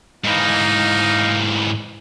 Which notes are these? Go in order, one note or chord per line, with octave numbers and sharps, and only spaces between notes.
G#2 E3 D#4 F5